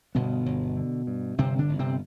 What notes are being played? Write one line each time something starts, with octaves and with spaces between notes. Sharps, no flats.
G1 B2 B3
G1
D3
G2
G1 C3 C4
D3 D4
G1
C3 C4